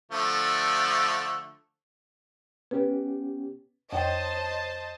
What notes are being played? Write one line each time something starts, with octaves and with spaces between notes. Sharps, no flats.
D3 F3 A3
B3 C#4 G4 B4
F2 C5 C#5 D#5 G5 A5